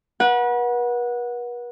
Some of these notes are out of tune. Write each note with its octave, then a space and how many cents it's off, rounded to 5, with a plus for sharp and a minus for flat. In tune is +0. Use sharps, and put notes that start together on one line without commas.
B4 -40 F#5 -15